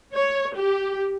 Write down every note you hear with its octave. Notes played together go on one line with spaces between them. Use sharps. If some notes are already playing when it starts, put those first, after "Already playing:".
C#5
G4